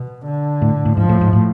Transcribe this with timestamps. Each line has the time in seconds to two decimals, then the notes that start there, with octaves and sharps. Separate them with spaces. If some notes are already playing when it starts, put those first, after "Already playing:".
Already playing: B2
0.25 D3
0.62 A2
0.85 A2
0.97 G#2 F3
1.09 A2
1.21 G#2
1.33 A2